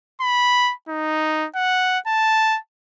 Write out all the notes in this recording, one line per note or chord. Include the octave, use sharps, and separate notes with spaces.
B5
D#4
F#5
A5